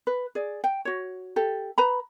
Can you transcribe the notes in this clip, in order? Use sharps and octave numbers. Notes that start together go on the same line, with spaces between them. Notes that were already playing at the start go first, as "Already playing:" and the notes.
B4
G#4 D5
G5
F#4 C#5
G4 A4
B4 A#5 B5